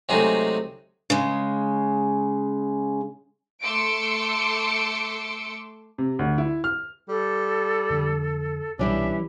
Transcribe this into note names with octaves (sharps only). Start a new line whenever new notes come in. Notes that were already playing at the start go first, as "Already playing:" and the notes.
C3 F#3 G#3 A3 D#4 G#4
C#3 G#3
A3 C6 D6 E6 C#7 D7
C3
D2
E4
F6
G3 A4
F2 D3
C2 B2 E3 G3 C#4 D4 E5